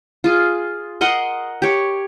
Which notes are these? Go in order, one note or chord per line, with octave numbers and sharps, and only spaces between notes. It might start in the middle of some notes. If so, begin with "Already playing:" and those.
F4 G#4
A#4 D#5 F#5 C6
G4 C#5